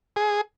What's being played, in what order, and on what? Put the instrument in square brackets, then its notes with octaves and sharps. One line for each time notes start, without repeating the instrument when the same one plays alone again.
[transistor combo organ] G#4